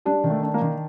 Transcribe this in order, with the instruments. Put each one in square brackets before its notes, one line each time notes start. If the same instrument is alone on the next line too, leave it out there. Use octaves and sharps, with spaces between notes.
[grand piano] G3 [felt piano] D4
[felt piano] D#3
[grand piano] A3
[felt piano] D4
[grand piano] A#3
[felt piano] D#3